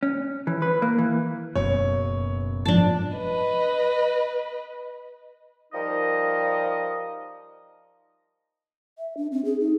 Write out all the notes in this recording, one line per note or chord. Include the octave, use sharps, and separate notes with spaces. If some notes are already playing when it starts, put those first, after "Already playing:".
C#4
E3
B4
A#3
E3
F#1 F#2 B2 C#5
G#2 F3 D4 A5
B4 D#5
F3 G3 D#4 A#4 D#5
E5
D4
C4
G#4
D#4